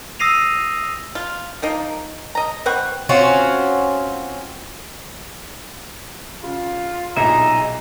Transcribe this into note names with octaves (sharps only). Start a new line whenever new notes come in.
D#6 E6 A#6 C7 D#7 F7
F4
F3 A#3 D#4
D#5 A#5
C4 B4 F#5 C#6
C4 C#4 F4 F#4
C#3 F4
B1 A#2 D#4 G#4 E5 A#5